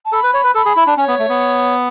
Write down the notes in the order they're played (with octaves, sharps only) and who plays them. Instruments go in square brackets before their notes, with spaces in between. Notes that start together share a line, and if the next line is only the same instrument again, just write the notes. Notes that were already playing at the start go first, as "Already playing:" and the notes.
[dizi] A5
[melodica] A4 [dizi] B5
[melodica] B4
C#5
B4
[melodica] A4 [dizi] B5
[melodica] G#4
E4
D4
[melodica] C#4 [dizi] C#5
[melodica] B3
A3
B3